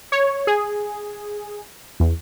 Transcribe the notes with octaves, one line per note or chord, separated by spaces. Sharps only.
C#5
G#4
E2